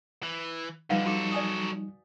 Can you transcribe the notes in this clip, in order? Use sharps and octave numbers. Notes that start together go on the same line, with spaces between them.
E3
G2 D3 F3 G3 D#4 B4 F5 F#5
F#3 F#4 A4 D6
D5 G#5 D#6